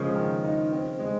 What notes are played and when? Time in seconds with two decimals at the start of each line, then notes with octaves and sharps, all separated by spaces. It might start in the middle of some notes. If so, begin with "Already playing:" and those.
Already playing: C#3 F3 G#3 A#3
0.15 D#3
0.44 D#4
0.72 C4
0.99 G#3